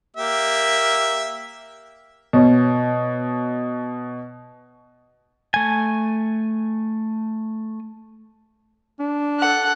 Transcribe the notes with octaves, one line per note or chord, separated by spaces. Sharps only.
A#3 G4 E5
B2 C#5
A3 G#5
D4
A4 F#5